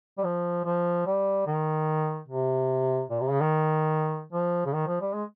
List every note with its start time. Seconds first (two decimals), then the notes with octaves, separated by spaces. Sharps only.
0.18 G3
0.24 F3
0.65 F3
1.06 G3
1.47 D#3
2.28 C3
3.10 A#2
3.21 C3
3.31 C#3
3.41 D#3
4.32 F3
4.66 C#3
4.73 D#3
4.87 F3
5.01 G3
5.14 G#3